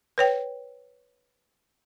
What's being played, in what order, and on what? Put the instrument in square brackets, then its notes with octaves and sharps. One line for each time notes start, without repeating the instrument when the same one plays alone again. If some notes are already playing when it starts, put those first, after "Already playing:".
[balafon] B4 C#5 G5